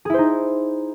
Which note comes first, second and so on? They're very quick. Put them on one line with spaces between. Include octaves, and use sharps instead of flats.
G#4 E4 C5 D#4